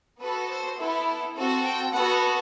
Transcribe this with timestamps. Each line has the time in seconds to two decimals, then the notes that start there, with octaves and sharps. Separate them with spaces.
0.21 B3 F#4 A4 B4
0.49 C5
0.78 B3 E4 A4
1.35 C4 F#4 A4
1.64 G5
1.92 B3 F#4 A4 F#5